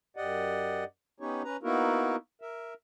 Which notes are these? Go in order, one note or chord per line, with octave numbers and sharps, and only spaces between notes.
F#2 G4 D5 D#5 F#5
B3 C#4 D#4 G4 C#5
C#4 B4 A#5
A#3 B3 D#4 E4 F#4 A#4
A#4 E5